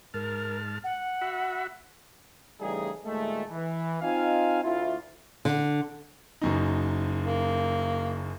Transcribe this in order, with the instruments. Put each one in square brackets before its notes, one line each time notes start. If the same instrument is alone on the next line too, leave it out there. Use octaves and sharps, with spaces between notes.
[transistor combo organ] G#2 A5 F6 [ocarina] A#4
[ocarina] F#5
[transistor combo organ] F#4 E5 B5
[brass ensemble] C#3 E3 G3 A3 D#4 G#4
D#2 A#2 G#3 A3
E3
C4 D#4 F4 D#5 F5 G#5
D2 E4 F4
[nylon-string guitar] D3
[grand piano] F#1 F#2 D#4
[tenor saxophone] A#3